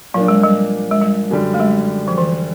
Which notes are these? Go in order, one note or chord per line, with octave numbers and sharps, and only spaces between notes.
A#2 F3 F#3 A#3 D4
G#3
G3
G#3
G3
F#2 D3 G3
A3
G#3
F3
E3